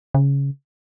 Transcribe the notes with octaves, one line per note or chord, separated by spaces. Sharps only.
C#3